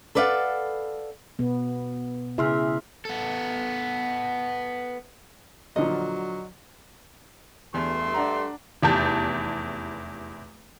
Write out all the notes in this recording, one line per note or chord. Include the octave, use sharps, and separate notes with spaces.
A4 B4 D5 D#5 F5 F#5
B2 B3
C#3 E4 G#4 E5 C6 F6
B3 A4
A#2 D3 F3 F#3 D#5
E2 G2 A3 C6
D4 F#5 A#5
F1 E2 G4 A5 G6